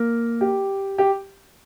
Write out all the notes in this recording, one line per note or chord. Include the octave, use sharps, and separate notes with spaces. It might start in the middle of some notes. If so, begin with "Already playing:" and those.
Already playing: A#3 A#4
G4
G4